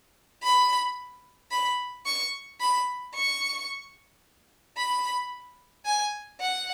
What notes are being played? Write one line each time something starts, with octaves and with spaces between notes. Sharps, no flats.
B5
B5
C#6
B5
C#6
B5
G#5
F#5